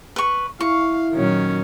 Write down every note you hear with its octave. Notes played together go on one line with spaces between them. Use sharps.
B4 C#6
E4 F5 C#6
A#2 D#3 F#3 C#4